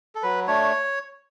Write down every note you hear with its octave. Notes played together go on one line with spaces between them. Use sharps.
A4
F#3 B4
A3 D4 C#5